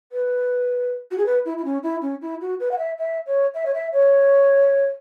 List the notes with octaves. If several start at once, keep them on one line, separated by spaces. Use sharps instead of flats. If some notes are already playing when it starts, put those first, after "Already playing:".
B4
F#4
G#4
B4
E4
E4
C#4
E4
C#4
E4
F#4
B4
F#5
E5
E5
C#5
E5
C#5
E5
C#5